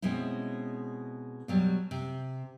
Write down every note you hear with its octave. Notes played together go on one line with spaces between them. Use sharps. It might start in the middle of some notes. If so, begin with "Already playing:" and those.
B2 G#3 C4 C#4 E4
B2 F#3 G3
C3